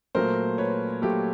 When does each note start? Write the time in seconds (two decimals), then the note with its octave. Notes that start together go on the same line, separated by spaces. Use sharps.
0.15 A#2 F#3 A3 A#4 C5
0.58 B4 C#5
1.02 A#2 F#3 A3 G4 A4